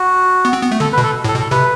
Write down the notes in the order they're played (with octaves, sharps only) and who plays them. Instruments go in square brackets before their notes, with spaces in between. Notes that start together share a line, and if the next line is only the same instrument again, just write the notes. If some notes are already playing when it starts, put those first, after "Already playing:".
Already playing: [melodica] F#4
[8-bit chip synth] B3
C4
B3
A3
[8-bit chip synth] D3 [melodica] A4
[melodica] B4
[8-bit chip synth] B2
[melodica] A4
[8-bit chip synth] A2
[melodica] A4
[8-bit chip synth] B2
[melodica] A4
[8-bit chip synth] C3 [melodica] B4